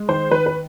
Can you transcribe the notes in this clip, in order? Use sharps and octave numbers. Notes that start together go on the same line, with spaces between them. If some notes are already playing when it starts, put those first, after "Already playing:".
Already playing: G#3
D#3 C5
D#3 B4
B4